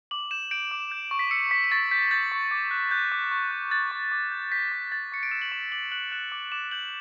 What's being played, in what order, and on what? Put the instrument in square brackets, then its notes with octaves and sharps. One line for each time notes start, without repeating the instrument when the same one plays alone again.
[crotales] D6 F#7
G6 E7
G6 D7
D6
G6
C#6
B6
E6 C#7
C#6 B6
B6
C#6 A6
G6 B6
G6 A6
C#6
D6
F#6
F#6 G6
D6
C#6
F#6
F#6 A6
C#6
D6
G6
G6 B6
D6
G6 A6
C#6 C#7
D7
E6 E7
F#7
C#6 E7
D6 F#7
F#6 F#7
F#6 E7
D6
D6 E7
G6 F#7